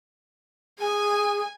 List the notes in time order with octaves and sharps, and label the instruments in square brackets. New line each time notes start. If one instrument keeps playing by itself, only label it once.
[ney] G#4 [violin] G#5